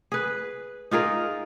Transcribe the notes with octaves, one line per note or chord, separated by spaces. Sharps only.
G#4 B4
D#4 F4 G#4 A#4